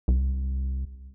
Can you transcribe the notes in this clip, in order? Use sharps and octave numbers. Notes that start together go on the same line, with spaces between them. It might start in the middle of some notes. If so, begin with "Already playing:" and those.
C2